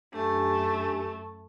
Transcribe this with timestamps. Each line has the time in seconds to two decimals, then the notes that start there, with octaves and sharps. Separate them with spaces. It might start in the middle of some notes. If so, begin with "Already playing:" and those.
0.13 F#2 A3 D4 G4 G#5